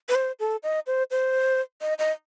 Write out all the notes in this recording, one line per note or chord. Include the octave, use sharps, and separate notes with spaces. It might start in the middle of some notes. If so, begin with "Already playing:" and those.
B4
C5
A4
D#5
C5
C5
D#5
D#5